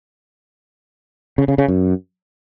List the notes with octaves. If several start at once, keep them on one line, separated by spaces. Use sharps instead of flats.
C#3
C#3
C#3
F#2